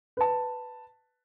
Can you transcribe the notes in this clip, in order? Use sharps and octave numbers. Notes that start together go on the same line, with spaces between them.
B4 A5